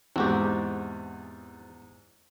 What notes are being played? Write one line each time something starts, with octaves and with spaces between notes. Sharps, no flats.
E2 G#2 C4 F#4 G4